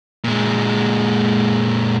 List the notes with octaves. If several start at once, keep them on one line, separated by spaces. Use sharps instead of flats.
A#2 G#3